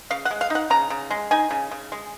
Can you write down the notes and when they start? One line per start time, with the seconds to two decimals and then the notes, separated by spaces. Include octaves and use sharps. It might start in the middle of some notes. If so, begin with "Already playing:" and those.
0.10 C#3 F5
0.25 F#5
0.31 G#3
0.41 F5
0.50 D#4 F#5
0.70 C#3 A#5
0.90 C#3
1.11 G#3
1.31 D#4 G#5
1.51 C#3
1.71 C#3
1.92 G#3